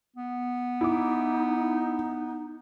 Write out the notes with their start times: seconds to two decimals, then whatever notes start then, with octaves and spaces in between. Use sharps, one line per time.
0.16 B3
0.81 D#4 E4 D6